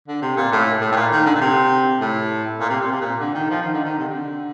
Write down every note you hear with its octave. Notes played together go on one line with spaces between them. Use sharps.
D3
C3
A#2
A2
A2
A2
A#2
D#3
D3
A#2
C3
A2
A#2
C3
A#2
C3
A#2
D3
D#3
F3
D#3
D3
D#3
C3
D3